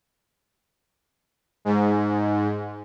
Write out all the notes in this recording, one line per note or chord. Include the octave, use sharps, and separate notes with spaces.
G#2